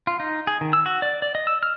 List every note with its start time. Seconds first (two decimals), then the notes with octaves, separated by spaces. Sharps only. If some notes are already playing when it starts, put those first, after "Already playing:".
0.07 F4
0.20 D#4
0.47 G#4
0.61 D#3
0.73 E6
0.86 F#4
1.02 D5
1.22 D5
1.35 D#5
1.47 E6
1.63 F6